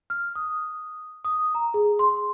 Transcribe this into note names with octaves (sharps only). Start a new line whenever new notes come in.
F6
D#6
D#6
A#5
G#4
C6